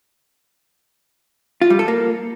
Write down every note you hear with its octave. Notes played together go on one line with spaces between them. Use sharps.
F4
G3
A4
A#3